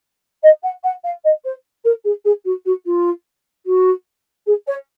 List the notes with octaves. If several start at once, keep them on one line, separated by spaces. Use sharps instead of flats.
D#5
F#5
F#5
F5
D#5
C5
A#4
G#4
G#4
F#4
F#4
F4
F#4
G#4
C#5